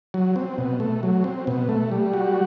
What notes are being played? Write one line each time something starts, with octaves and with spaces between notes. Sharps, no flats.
F#3
C4
B2
A3
F#3
C4
B2
A3
G3
F#4